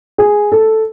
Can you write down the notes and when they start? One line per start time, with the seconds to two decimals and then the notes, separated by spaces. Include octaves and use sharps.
0.18 G#4
0.52 A4